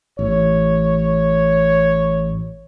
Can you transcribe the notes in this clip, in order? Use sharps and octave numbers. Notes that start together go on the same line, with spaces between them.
A1 C#5